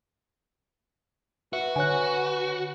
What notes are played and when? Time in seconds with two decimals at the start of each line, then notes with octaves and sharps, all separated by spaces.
1.53 F#4 B4 E5
1.76 D3 C#5 G#5 F#6